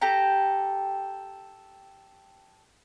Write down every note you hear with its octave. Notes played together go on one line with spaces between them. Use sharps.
G4 A4 A#5